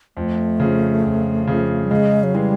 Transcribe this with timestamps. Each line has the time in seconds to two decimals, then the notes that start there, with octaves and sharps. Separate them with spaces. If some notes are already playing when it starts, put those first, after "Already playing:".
0.17 F2 A3
0.60 C#3 F3
1.04 F2
1.47 C#3 F3
1.84 G3
1.91 C#3 G#3
2.23 F#3
2.34 E3 G3 G#3